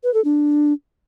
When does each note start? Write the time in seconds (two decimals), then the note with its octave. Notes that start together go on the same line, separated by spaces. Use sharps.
0.04 B4
0.14 A4
0.25 D4